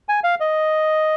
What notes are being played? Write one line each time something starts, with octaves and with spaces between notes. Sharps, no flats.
G#5
F5
D#5